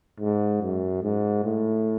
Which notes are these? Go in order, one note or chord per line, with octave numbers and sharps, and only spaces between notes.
G#2
F#2
G#2
A2